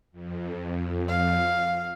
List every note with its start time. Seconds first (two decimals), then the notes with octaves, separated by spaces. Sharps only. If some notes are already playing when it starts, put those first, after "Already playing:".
0.12 F2
1.09 F5